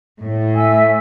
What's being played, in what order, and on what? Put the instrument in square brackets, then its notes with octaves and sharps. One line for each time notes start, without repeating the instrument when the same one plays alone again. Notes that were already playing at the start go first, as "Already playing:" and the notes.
[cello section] A2
[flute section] E5 G#5 E6